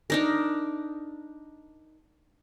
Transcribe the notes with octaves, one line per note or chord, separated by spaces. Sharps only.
D4 D#4 A#4